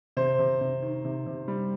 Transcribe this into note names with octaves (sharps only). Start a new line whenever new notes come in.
C3 C5
C3
C3
D#3
C3
C3
G3